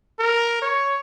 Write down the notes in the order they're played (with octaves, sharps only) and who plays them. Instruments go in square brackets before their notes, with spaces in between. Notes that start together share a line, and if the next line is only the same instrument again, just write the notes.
[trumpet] A#4
C#5